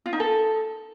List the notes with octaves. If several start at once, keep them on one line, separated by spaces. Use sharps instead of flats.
F4
D#4
A4